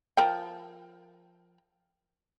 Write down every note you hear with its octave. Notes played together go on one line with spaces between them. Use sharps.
F3 A#4 G5